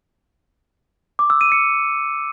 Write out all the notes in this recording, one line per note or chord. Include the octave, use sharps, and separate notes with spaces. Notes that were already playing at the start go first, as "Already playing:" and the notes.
D6
E6
D#7
C#7